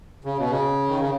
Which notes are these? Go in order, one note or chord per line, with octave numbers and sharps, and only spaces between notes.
C#3
B2
C#3
D#3
C#3